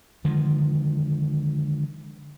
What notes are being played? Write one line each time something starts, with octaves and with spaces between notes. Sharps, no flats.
D3 D#3 F3 G#3